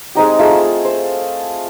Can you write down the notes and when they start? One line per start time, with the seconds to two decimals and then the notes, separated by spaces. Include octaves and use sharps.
0.15 G#3 C4 D#4 G4
0.39 A3 F4 G#4 E6
0.85 C5